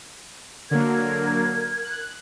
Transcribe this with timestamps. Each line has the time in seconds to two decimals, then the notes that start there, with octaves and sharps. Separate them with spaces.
0.71 D3 F#3 A#3 A#4 G#6
1.84 F#6